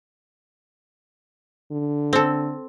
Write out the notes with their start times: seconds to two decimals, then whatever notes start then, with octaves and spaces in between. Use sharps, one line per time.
1.72 D3
2.13 C4 A4